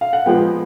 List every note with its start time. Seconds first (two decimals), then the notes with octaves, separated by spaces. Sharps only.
0.01 F5
0.13 F#5
0.26 A#2 F3 G#3 B3 G5